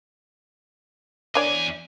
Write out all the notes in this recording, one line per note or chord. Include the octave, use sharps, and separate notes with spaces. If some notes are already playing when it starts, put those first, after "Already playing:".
E2 D4 C#5 D5 G#5